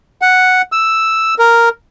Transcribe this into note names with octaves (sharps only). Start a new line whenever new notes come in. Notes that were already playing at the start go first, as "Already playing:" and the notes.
F#5
E6
A#4